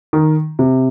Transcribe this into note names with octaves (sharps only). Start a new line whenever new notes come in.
D#3
C3